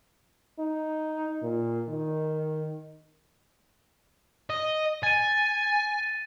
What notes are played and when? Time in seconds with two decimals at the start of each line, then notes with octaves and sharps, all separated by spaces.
0.59 D#4
1.43 A#2
1.89 D#3
4.50 D#5
5.03 G#5 A6 D#7